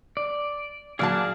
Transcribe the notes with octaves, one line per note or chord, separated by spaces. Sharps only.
D5
A#2 F#3 G#4 D5 F5 A5